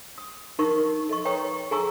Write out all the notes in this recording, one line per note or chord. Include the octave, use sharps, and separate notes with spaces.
D#6
D#4 A#4 C#6
A4 D#5 C#6
B4 C#5 G5 A#5 C#6 D#6
G#4 A4 G#5 A#5 C#6 E6